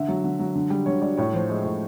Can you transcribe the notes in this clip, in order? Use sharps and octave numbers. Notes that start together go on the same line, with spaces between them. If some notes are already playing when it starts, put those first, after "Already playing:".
Already playing: D3 E5
F#3
D3
F#3
D3
G3
D3 C#5
G3 D5
A2 C#5
F3 C5
G#3
A2